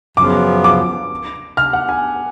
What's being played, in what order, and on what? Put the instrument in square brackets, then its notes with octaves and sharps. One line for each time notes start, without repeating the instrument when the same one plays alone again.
[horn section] F#2 C#3 F3 B3 F4 [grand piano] D6
[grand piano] D6
F6
F#5
G#5